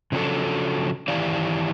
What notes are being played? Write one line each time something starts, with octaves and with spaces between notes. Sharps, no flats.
C#3 F3 F#3 D4 A4
D#3 E3 E4 G4 D5 F5